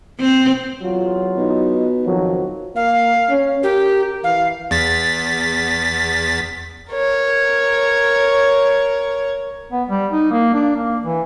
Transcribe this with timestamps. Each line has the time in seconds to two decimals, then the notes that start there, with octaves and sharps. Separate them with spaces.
0.20 C4
0.82 E2 F#3 F4
1.37 B2 D#4
2.05 F2 D#3 F3 F#3
2.76 A#3 F5
3.30 C#4
3.63 G4 A#4
4.24 E3 F5
4.71 E2 A6 B6
6.92 A#4 C#5
9.72 B3
9.89 G3
10.12 D#4
10.31 A#3
10.54 D4
10.76 A#3
11.02 E3